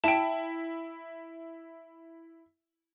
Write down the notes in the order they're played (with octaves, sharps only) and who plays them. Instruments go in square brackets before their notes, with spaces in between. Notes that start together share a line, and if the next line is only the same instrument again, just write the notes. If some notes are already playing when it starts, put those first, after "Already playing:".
[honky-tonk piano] E4 [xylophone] G5 A5